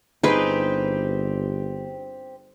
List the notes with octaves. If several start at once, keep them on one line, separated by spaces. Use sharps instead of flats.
G1 C4 D#4 G4 G#4 B4